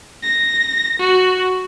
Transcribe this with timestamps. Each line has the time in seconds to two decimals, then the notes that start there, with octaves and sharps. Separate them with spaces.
0.23 A#6
0.99 F#4